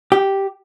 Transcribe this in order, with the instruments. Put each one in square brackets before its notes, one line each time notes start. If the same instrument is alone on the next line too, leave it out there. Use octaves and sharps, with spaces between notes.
[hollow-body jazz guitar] G4